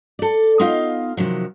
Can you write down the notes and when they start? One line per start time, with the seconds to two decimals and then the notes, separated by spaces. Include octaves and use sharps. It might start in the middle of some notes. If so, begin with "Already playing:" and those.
0.19 A4 D5
0.60 B3 D#4 F4 D#5 F5
1.17 C3 D#3 F3 F#3